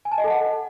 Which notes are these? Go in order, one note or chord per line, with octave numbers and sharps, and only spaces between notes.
G#5
A5
D#5
A4
F#5